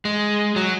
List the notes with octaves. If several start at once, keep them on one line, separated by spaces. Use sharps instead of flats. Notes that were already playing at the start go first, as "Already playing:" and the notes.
G#3
F#3